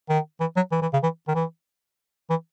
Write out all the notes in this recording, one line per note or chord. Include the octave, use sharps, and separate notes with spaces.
D#3
E3
F#3
E3
E3
C#3
E3
D#3
E3
E3